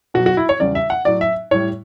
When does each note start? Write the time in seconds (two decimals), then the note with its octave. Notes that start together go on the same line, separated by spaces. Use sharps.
0.14 B2 F#3 F#4
0.26 F#4
0.37 E4
0.49 C#5
0.60 E2 C#3 G3 D5
0.75 E5
0.90 F#5
1.05 A2 F#3 D5
1.21 E5
1.51 A2 G3 C#5